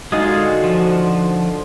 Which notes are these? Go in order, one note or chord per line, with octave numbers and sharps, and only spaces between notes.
D3 G#3 D#4 F4 F#4 G#4 D#5 D#6
F3